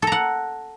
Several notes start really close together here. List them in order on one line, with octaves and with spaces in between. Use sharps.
A4 A#5 F#5